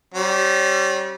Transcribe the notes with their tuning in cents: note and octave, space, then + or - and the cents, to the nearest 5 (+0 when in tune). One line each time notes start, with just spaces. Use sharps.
G3 -25 C#4 -40